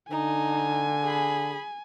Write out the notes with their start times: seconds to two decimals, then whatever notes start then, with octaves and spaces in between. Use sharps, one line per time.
0.10 D3 D#4 G#5
1.03 G#4 B5